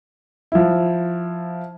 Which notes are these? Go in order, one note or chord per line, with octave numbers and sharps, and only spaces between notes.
F3 E4